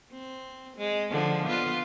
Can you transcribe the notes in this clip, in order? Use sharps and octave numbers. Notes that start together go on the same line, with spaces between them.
C4
G#3
D3 F3
B3 F4 B4